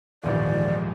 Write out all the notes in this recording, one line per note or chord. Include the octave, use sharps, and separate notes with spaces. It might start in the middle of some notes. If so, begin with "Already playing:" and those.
D#1 A#1 E2 G#2 D#3 F3 D5